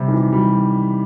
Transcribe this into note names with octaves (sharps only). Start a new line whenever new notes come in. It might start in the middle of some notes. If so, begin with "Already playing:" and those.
Already playing: C3 G3
D#3
E3
G3